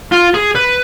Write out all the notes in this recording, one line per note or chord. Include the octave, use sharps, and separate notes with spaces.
F4
G#4
B4